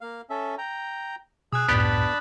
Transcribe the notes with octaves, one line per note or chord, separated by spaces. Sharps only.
A#3 F5
C#4 A4 E5
G5 A#5
B2 G#4 D#6 E6 F#6
C#2 F#2 A2 B3 D4 G4 A5 B5